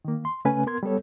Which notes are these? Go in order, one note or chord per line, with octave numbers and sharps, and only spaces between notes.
D#3 A#3
C6
C#3 A3 C#4 B4 G#5
B3 A#4 C6 G#6
G3 B3 A4 C#5